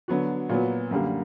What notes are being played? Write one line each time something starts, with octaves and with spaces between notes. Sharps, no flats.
D3 F#3 B3 F#4
A#2 F#3 B3
F#2 D3 G3 A#3